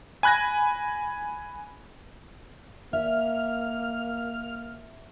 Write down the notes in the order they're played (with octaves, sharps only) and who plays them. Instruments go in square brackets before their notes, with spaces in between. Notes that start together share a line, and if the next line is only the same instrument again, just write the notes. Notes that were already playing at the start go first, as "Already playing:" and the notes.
[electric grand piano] G#5 B5 F#6 G#6 A#6
[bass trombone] A#3 [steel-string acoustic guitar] E5 [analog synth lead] F6